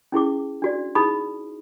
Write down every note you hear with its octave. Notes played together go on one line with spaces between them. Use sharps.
C#4 E4 G#4 D6
D4 F#4 D5
D#4 E4 G#4 B5 D#6